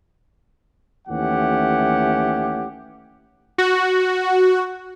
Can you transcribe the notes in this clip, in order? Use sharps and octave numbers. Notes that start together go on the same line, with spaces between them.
D#2 E3 A3 C#4 G4 F#5
F#4